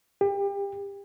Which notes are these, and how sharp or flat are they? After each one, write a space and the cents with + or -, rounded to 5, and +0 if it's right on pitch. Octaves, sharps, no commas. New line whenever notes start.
G4 +30